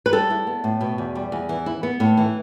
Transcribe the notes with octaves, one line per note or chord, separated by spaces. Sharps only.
B4
G3 A4
E4
B3
A2
B2
E2
G3
E2
E3
E4
B3
A2
E3